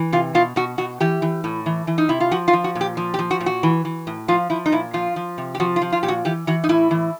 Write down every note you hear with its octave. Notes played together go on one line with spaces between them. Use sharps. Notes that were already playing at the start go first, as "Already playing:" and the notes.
Already playing: E3
C3 F4
B2 F4
B2 F#4
B2 F#4
E3 G4
E3
A2
E3
E3
D#4
C3 E4
F4
F3 F#4
F4
F3
F#4
A#2
G4
F3
G4
F3
F#4
A#2
F#4
E3
E3
A2
F3 F4
F3 E4
D#4
A#2 E4
F3 F4
F3
C3
G4
F3 F#4
F4
F3
F4
A#2 G4
F#4
E3 G4
E3 F#4
D#4
A2 E4
E3